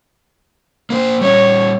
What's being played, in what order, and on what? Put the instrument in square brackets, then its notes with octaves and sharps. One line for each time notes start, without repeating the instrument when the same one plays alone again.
[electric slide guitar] A#3 B4 C5
[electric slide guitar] G3 C#4 [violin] C#5